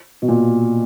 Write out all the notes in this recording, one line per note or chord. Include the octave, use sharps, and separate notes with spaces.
B2
A#2